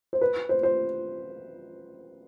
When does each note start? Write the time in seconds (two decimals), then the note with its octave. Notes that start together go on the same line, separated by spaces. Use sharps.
0.13 C5
0.21 B4
0.49 C5
0.63 C5